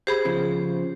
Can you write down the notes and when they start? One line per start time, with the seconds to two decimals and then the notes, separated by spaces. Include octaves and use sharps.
0.07 G4 G#4 C5 B5
0.25 C#3 F3